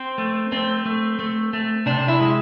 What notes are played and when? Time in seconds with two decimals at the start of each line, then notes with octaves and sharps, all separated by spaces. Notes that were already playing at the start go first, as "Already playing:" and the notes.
Already playing: C4
0.18 A3
0.52 A3 C4
0.86 A3
1.19 A3
1.53 A3
1.86 C3 D4
2.08 E4
2.20 G#3